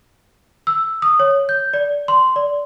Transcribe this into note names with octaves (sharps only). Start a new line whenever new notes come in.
E6
D#6
C#5
G6
D5
C6
D5